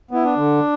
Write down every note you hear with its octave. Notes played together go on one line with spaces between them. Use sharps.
B3 E4
D4
D3